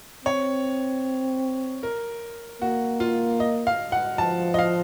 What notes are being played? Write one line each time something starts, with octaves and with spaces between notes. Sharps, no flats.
C4 C#5
A#4
A#3 F#4
F4
D#5
F5
F#5
F3 A5
D#5
F5